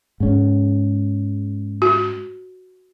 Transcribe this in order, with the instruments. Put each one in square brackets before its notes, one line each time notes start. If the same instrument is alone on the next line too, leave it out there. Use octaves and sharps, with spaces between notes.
[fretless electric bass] G#2 C#4
[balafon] F#4